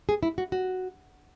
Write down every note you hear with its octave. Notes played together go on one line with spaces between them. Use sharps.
G#4
E4
F#4
F#4